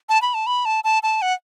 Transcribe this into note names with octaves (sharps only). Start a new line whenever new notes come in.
A5
B5
A5
B5
A5
A5
A5
F#5